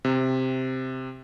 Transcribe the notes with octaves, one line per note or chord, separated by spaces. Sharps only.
C3